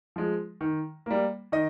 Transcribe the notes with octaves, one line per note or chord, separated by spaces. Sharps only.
F3 G#3
D#3
G3 A#3
D#3 D#5